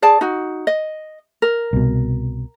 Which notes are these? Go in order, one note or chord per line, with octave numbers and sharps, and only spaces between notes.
G#4 D5 A5
D#4 F#4
D#5
A#4
C2 B2